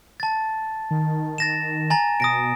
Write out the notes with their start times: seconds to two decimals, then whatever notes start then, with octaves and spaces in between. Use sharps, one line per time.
0.20 A5 A6
0.91 D#3
1.38 A6 A#6 E7
1.90 G#5 A#5 A6
2.20 B2 D#6 A#6 D7